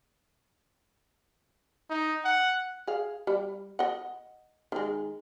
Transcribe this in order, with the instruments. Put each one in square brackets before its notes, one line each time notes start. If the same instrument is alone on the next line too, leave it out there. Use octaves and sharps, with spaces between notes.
[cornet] D#4
F#5
[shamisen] G#4 F5
G3
D#5 F#5
D#3 G#3